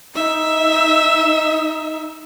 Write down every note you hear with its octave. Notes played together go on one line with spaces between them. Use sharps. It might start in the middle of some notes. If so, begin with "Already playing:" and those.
D#4 E5